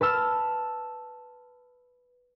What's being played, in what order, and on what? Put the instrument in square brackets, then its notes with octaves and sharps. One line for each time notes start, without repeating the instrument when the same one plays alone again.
[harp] B4 A5 E6 F6